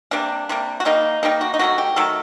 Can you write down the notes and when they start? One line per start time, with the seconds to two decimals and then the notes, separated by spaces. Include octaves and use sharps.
0.11 C3 G3 A#3 D4
0.49 C3 G3 A#3
0.80 F#4
0.85 D#3 G3 A#3 D#4
1.23 D#3 G3 A#3 D#4
1.41 F#4
1.54 D#4
1.59 D#3 F#3 A3 F#4
1.78 G4
1.96 D#3 F#3 A3 A4